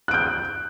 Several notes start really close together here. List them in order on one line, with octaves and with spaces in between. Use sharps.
F#6 D7 G6